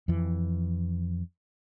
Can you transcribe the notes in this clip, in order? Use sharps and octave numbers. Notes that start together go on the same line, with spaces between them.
F2 E3